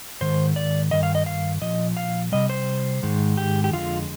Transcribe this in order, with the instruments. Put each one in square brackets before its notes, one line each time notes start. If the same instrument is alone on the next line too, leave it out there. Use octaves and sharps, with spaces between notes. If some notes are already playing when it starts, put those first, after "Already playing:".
[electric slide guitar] G#2 D#3 C5
D5
G2 D#3 D#5
F5
D#5
F5
A#2 F3 D#5
F5
C3 G3 D#5
C5
G#2 D#3 G#3
G4
G4
F2 D3 G#3 F4